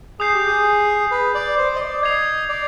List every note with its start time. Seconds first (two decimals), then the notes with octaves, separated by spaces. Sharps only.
0.20 G#4 D#6 G6 C7
0.34 G4
0.47 G#4
1.11 B4
1.35 D5
1.57 C5
1.76 D#5
1.81 D5
2.03 D#5 G#6 C7 F7
2.49 D5